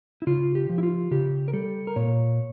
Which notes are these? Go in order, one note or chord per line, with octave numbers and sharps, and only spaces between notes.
E4
C#3 F4
G4
F3
E4
F4
C#3 G4
A#4
G3 A4
A#4
A#2 C#5